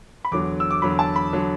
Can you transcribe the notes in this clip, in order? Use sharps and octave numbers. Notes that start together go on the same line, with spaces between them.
B5
E2 D3 F#3 D6
E6
D6
E2 D3 F#3 B5
A5
B5
D3 F#3